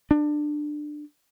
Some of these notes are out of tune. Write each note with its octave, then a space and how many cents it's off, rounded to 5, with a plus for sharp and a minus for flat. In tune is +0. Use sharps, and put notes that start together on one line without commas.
D4 +20